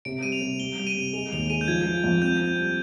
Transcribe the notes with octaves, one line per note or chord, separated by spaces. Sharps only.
C3 D7
G3 D#7
F7
C3
G3 G7
G3 F7
D#7
C3
G#3 F7
D#2 F7
F7
G#3 D#7
G6
F3 G#6
F3
F2
C4 G6
C4
G3